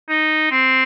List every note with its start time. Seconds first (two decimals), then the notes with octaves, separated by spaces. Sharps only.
0.09 D#4
0.51 C4